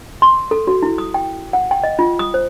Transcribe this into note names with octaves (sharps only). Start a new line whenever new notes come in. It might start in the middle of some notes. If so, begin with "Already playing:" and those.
C6
A4
F#4
E4
D#6
G5
F#5
G5
D#5
F4
D#6
C5